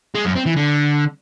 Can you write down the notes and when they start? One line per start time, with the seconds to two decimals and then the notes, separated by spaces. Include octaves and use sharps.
0.15 G#3
0.25 F#2
0.35 C4
0.46 E3
0.56 D3